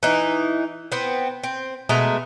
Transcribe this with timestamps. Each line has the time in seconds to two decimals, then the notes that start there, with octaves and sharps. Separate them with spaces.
0.03 E3 D#4
0.92 B3 C4
1.44 C4
1.89 B2 G#3 A3 A#5